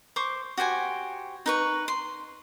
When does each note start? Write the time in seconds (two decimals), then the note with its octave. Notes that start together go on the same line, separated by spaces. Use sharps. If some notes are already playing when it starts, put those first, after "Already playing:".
0.16 C5 C#6 D6
0.57 F#4 G4 C5 G#5
1.46 D#4 B4 C#6
1.88 C6